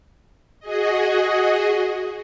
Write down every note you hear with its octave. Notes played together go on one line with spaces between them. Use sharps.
F#4 G#4 D#5